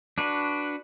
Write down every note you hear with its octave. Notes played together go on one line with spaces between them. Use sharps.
D4 F#4 B4